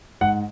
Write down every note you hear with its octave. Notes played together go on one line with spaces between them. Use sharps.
G#2 F#5